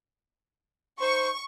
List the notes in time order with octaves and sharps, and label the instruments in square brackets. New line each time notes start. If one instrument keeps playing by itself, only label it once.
[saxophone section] D#4 C5 [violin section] C#6